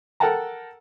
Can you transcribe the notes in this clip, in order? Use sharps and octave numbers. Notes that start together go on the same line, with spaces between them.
A4 A#4 F#5 G5 A5 A#5